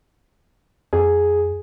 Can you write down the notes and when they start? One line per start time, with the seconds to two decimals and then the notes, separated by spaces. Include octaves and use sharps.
0.93 F2 G#4